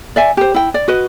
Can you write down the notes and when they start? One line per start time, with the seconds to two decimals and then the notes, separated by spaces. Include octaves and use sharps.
0.16 D5 E5 G#5
0.37 G4 C5
0.54 E4 G5
0.74 D5
0.88 F#4 B4 D#5